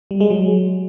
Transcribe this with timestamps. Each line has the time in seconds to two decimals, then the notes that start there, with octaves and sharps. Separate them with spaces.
0.11 G3
0.20 G#3
0.30 F#3